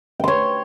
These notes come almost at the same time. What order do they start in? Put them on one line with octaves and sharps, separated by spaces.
G5 C6 C#5